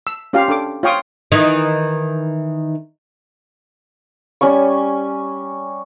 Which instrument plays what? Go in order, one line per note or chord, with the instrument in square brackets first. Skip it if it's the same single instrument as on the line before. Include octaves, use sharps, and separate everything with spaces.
[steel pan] E6
C#4 F4 G4 F5
D4 A4 D6
F4 C#5 F5 G5 C#6 D#6
[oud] D#3 E3
[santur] G3 C#4 G#5 C#6